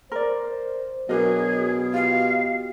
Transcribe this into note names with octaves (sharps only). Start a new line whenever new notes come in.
A#4 C5 D5
B2 F#3 D4 G#4 A#4 D#5
F4 G4 F5